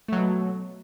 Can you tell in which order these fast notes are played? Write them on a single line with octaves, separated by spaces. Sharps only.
A3 F#3 B2